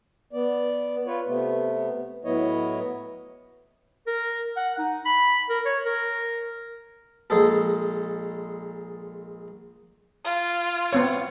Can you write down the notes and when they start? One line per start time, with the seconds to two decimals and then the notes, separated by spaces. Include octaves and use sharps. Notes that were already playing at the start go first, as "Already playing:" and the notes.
0.33 B3 D5
1.07 F4 B4 C#5
1.27 C3 A3 B3
2.25 A2 F#3 B3 E4 C#5 D#5
4.07 A#4
4.57 F#5
4.78 D#4
5.05 B5
5.49 A#4
5.66 C#5
5.85 A#4
7.30 A#1 G#3 G#4 A4
10.24 F4
10.93 B3 C4 C#5